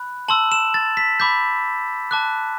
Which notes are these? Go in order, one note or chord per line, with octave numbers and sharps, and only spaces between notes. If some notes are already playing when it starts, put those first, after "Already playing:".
Already playing: B5 F#6
A5 C6 E6 F#7
E7
A6
B6
B5 D6 G6 B6
A5 D6 F#6